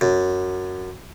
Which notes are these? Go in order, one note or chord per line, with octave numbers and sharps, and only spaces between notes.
F#2